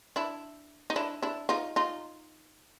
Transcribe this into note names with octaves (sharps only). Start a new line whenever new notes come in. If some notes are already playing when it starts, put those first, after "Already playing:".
D4 E4
D#4
D4 E4
D4 E4
D#4 F4
D#4 F4